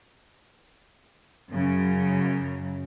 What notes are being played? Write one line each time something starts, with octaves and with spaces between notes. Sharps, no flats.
F#2 C#3 F#3